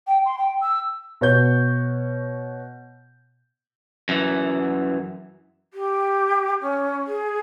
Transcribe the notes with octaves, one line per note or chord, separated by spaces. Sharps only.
G5
C6
G5
E6
B2 C#5 G6
F#2 E3
G4
C#4
G#4